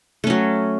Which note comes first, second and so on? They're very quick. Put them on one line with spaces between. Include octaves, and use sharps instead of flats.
A3 C#4 F#3